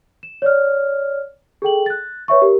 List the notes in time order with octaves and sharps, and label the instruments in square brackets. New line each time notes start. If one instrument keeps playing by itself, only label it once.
[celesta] E7
C#5 D5 F6
G#4 A4 G5 F#7
F#6 A6
B4 C#5 E5 C#6
G4 A#4